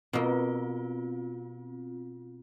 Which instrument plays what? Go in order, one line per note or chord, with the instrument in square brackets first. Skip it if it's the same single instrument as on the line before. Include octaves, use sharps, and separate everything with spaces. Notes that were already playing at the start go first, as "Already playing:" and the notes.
[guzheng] B2 A#3 [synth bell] C4 F4